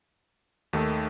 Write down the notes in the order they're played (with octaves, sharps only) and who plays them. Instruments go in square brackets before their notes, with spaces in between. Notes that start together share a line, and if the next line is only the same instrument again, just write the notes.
[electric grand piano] D#2 D#3 A3 D#4 A4